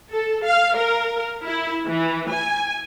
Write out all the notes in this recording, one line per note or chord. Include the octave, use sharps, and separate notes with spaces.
A4
F5
A#4
E4
E3
G#5